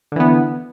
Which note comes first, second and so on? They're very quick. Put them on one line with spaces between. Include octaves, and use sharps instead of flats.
D3 E3 B3